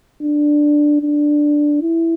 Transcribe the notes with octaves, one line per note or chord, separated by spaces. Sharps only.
D4
D4
E4